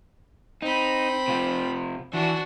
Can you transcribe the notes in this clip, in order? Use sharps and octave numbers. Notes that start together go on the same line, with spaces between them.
C4 D#4 B5
C3 F4
E3 D4 F#4